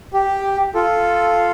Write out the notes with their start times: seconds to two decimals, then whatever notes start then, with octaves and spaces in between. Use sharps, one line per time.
0.13 G4
0.75 F4 A4